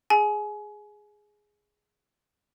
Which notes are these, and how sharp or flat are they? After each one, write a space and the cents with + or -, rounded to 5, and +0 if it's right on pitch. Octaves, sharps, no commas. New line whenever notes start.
G#4 +0 G#5 +25